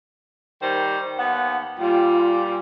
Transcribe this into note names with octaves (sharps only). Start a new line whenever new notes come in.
D#3 G3 C5
D#2 B3 F#5
A#2 G3 F4